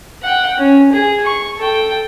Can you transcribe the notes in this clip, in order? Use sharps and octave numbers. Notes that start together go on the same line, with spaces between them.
F#5 G5
C#4
G#4
C#6
A4 G5